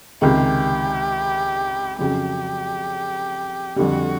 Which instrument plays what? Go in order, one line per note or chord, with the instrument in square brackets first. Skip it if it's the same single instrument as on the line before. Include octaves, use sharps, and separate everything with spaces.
[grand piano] C#2 C3 D#3 G#3 [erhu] G4
[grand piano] F2 C#3 F#3 [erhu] G4
[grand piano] F2 D3 G3 [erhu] F#4